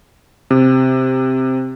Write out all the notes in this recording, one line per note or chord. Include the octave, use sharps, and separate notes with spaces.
C3